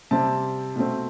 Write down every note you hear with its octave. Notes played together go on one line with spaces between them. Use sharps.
C3 G3 C4 A5
B2 A3 C4